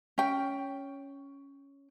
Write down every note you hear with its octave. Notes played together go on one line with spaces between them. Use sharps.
C#4 G5